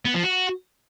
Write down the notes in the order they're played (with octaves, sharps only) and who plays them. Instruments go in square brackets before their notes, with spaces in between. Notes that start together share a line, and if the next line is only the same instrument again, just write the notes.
[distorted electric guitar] B3
F3
F#4